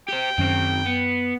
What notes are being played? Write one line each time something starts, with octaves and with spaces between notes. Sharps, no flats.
G4 C5 G5
F#2 D#3 C4 C#4
B3